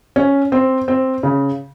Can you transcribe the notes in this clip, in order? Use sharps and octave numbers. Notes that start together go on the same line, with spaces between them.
C#4
C4
C4
C#3